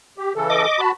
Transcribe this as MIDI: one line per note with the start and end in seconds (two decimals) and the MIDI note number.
0.18 0.33 67
0.35 0.66 49
0.35 0.66 52
0.35 0.66 69
0.50 0.81 75
0.50 0.81 86
0.79 0.91 66
0.79 0.91 81
0.79 0.91 83